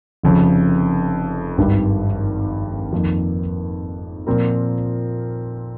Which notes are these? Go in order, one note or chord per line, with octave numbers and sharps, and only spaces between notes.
F1 F2 C#3
G#1 G2 D#3 G3
F2 D#3 A#3
A#2 F3 C4 F4 A#4